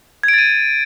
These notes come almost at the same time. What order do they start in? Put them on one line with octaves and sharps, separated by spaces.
G#6 D7 A6 D#7